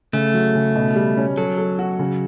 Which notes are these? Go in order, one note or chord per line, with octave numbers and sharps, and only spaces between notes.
C#3 A3
F#3
C#3
B2
G3
C#4
F#3 A4
A4
F#4
C#3